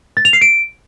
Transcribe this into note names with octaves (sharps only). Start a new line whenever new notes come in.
A6
F7
C7
D7